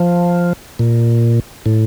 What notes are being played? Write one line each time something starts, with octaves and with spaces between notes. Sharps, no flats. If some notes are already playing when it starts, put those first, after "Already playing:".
Already playing: F3
A#2
A2